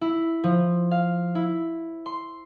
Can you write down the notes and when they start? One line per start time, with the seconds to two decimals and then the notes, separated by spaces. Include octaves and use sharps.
0.01 E4
0.44 F3
0.91 F5
1.35 E4
2.06 C6